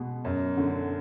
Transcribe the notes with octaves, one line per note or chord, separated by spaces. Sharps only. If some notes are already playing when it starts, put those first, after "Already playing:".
Already playing: B2 G#3 B3
F#2
D3